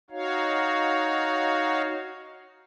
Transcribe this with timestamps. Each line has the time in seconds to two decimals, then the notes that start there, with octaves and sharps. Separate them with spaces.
0.10 D#4 F#4 C#5 F5